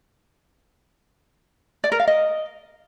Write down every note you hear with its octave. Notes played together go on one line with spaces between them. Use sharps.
D5
A#4
F5
D#5